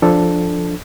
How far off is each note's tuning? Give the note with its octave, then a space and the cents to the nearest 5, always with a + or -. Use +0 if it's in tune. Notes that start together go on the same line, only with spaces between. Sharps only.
F3 +0 D4 +0 A4 +0